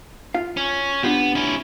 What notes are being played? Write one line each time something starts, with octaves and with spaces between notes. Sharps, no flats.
F4 F5
C#4
B3 D4 F4 G4
C#4 E4